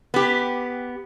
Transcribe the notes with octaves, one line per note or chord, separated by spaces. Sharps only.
B3 G4